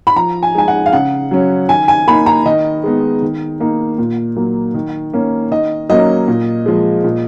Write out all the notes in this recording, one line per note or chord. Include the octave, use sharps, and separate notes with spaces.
B5
F3 A#5
G#5
G#3 D#4 G#5
F#5
F5
C#3 F#5
F#3 C#4
D#3 G#5
G#5
A#3 D#4 B5
A#5
D#3 D#5
G#3 B3 D#4
D#3
A#3 D#4
A#2
F#3 A#3
D#3
A#3 C#4
D#3 D#5
F#3 A#3 C#4 D#5
A#2
F3 G#3
A#2